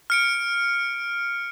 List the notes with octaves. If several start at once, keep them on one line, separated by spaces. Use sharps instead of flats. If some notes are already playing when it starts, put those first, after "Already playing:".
F6 C#7 D7